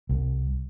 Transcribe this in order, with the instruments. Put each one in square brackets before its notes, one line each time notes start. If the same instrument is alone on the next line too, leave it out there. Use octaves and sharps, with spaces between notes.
[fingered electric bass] C2